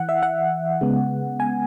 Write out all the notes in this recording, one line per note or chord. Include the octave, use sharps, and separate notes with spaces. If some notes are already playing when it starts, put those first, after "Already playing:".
Already playing: E3 F#5
E5
F#5
C#3 G#3 B3
G#5